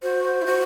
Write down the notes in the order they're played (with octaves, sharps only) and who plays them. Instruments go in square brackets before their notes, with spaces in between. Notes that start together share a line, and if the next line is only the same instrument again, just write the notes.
[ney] F#4 [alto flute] C5
[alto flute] C5
[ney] E4
[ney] F#4 [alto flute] C5